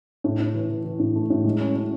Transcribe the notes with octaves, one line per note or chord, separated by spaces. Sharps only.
A2
A2
E3
E3
E3
A2
A3
A2
G#3
C#4
C#4